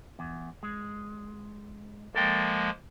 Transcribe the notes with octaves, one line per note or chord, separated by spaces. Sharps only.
E2
G#3
F3 G#3 A#3 A4 A#4 G5